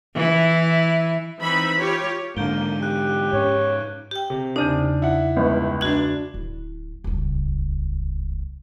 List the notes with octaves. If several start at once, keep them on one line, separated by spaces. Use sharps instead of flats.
E3 E4
E3 C4 D#4 E5 B5
F4 G4 C#5
G#2 D3 A#3 G6 D7 G7
G4 F#6
G#2 C#4 C#5
G4 G5
C3
E2 C#3 D4 D#4
E4 F#5
G1 C#2
D4 F#4 G#6 F#7
D1 E4
D#1 C#2